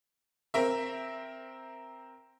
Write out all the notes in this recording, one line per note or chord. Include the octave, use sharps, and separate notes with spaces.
C4 A#4 E5